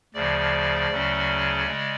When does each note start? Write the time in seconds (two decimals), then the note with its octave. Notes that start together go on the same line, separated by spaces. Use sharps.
0.14 D2 C#3 F3 D5
0.90 D2 C#3 F#3 C#4
1.66 C#3 G#3